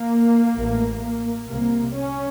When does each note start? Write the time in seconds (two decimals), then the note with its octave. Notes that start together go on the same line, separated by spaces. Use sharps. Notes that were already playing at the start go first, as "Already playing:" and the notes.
Already playing: A#3
0.55 A1 A2
1.49 C2 C3 A#3
1.97 C#4